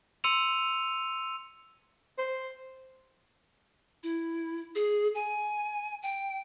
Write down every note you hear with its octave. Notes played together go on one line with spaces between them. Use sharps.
C6 E6 C#7 D#7 F7
C5
E4
G#4
G#5
G5